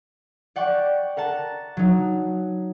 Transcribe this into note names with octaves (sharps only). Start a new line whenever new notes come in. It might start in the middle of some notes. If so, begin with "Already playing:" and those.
D5 F#5 G5 C#6 D6
A#4 F#5 A5
F#3 D#4